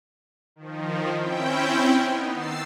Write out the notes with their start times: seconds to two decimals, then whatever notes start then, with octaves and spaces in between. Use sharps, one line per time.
0.56 D#3 F3
1.17 C4 C#4 E4 G5
2.04 B3 D#4
2.34 D#3 E6 A6 C7